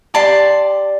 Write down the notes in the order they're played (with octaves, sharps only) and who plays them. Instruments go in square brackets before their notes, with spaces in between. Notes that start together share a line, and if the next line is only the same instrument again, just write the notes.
[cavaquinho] G4 D5 A5 C6